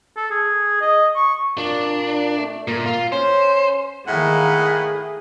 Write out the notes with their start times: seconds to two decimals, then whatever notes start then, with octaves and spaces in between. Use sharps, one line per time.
0.17 A4
0.31 G#4
0.81 D#5
1.16 C#6
1.58 A#2 D4
2.38 A3
2.67 A#2 A#4
2.86 F4
3.12 C#4 C5
4.07 A2 D#3 A#3 G#4 F#5